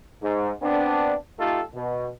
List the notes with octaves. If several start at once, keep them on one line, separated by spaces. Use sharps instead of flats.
G#2
B3 C4 D4
A3 D#4 F4 G4 A4
B2